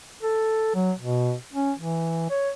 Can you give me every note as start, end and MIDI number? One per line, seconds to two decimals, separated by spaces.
0.23 0.75 69
0.75 0.92 54
0.99 1.34 47
1.53 1.72 61
1.79 2.29 52
2.30 2.51 73